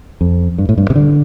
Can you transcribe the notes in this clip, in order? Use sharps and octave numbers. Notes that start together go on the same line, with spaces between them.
F2
G2
A2
G2
C3
D3